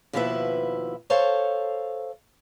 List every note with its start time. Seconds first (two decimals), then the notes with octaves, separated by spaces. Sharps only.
0.13 D#2 B2 F3 E4 B4 E5
1.10 A4 C5 C#5 F5